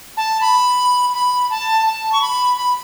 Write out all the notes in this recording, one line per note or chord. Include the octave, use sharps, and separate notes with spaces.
A5
B5
B5
A5
A5
C#6
B5
B5